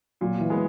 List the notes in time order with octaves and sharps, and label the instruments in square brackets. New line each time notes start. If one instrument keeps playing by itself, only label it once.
[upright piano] A#2 [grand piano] F#3
[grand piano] E3
[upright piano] G#3 B3